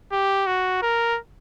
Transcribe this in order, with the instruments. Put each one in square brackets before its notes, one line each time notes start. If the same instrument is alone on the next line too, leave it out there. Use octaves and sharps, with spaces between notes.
[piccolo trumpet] G4
F#4
A#4